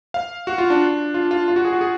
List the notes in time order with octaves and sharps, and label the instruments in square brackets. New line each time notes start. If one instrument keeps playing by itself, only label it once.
[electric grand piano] F5
F#4
F4
D4
F4
F4
F4
F#4
G#4
F#4
G#4